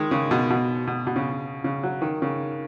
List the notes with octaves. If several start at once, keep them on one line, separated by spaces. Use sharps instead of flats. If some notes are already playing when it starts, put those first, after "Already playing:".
Already playing: D#3 G#3
C#3
B2
B2
B2
B2
C#3
C#3
F#3
D#3
C#3